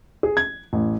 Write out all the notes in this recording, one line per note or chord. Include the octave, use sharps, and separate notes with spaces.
G#4
G#6
A1